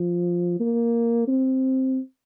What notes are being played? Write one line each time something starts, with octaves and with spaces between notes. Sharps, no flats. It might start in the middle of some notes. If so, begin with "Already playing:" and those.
Already playing: F3
A#3
C4